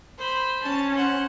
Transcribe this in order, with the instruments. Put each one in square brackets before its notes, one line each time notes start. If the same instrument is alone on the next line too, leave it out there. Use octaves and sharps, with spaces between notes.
[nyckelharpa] C5 B5
[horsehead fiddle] C#4 [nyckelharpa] A5
[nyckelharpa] C5 F#5